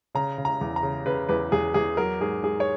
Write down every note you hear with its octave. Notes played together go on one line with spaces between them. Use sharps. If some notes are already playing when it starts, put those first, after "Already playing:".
C#3 A#5
C#3
A#5
E2
A#5
C#3
C#3 B4
E2 B4
E2 G#4
E2 G#4
F#3 A#4
G#2 G#4
G#2 G#4
C#5